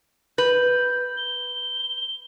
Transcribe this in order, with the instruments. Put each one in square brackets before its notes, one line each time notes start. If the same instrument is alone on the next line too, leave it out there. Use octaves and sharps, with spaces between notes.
[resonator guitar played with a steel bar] B4 [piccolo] G6
[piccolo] G7